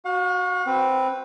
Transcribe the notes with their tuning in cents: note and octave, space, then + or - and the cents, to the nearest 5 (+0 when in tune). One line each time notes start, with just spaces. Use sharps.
F#4 +0 F5 +45
C4 +0 B4 +0